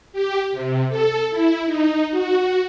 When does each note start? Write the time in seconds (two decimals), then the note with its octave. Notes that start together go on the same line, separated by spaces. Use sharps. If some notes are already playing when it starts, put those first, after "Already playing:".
0.13 G4
0.52 C3
0.89 A4
1.31 E4
1.66 D#4
2.11 F#4